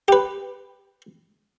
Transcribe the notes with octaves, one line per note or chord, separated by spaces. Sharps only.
G4 B4